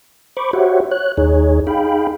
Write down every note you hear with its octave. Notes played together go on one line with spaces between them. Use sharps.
C5 B5 C#6 D6
F#4 G4 C5 C#5 E5 F#5
C#5 F#6
D#2 D#4 G#4 C#5
D#4 G#4 F5 G5 B5